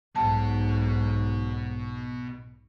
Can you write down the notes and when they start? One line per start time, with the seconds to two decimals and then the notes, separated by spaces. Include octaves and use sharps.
0.16 B1 G#2 B2 F#5 A5